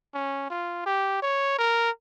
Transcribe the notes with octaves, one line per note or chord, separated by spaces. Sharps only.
C#4
F4
G4
C#5
A#4